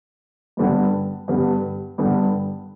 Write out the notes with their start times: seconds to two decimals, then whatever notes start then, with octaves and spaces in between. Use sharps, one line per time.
0.57 G2 D3 G3 B3
1.28 G2 D3 G3 B3
1.98 G2 D3 G3 B3